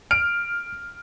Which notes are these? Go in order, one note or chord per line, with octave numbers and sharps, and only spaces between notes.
F6 D7